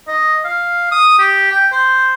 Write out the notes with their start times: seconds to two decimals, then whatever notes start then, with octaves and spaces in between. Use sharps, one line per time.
0.08 D#5
0.44 F5
0.91 D#6
1.19 G4
1.52 G5
1.72 C5